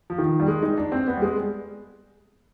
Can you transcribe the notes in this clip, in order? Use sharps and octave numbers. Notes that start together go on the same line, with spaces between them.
F3
D#3
G3
G#3
D#4
D4
C4
B3
G3
G#3